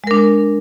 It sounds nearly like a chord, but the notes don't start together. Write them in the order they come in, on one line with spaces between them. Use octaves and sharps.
G#3 A#4 D4